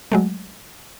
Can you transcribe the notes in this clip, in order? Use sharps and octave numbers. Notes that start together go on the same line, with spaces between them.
F#3 G#3 A3